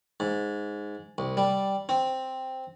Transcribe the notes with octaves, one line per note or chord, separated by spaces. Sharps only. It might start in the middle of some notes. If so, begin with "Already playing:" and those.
G#2
C2
G3
C4